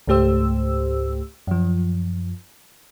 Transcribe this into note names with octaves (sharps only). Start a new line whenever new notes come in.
C#2 G#2 A3 G4 C5 E6
F#2 F3